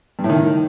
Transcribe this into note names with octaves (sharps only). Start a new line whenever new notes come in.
G2
A2
D#3